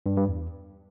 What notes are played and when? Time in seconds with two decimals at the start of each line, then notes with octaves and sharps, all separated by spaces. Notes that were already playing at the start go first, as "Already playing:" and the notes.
0.06 G2
0.17 G2
0.28 E2